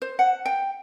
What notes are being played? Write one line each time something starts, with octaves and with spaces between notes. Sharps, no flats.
C5
F#5
G5